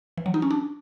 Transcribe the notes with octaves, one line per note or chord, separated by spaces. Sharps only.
E3
F#3
D#4
C#4
D4